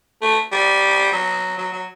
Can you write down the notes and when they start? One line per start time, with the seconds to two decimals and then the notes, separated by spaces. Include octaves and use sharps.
0.22 A3
0.52 G3
1.13 F#3
1.58 F#3
1.73 F#3